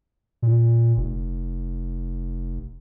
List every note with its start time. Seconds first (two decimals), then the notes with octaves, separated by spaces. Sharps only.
0.42 A#2
0.97 F1